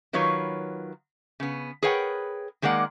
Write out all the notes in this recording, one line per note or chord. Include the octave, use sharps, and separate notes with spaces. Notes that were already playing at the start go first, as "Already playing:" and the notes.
D#3 F#3 F4 B4 C#5
C#3 B3
G#4 A#4 B4 C#5 F#5 G5
D#3 G#3 A#3 D5 F#5